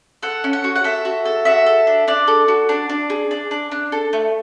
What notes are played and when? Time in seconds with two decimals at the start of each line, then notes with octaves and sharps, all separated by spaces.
0.23 A4 F#5
0.44 C#4
0.53 F#5
0.64 F#4
0.76 F#5
0.84 A4 E5
1.05 F#4
1.25 A4
1.45 F#4 E5
1.66 A4
1.87 D4
2.07 D4 D5
2.28 A4
2.48 F#4
2.69 D4
2.89 D4
3.10 G#4
3.31 D4
3.51 D4
3.71 D4
3.92 A4
4.13 A3